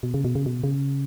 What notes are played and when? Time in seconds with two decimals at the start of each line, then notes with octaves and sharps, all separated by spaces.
0.03 B2
0.14 C#3
0.25 B2
0.35 C#3
0.46 B2
0.64 C#3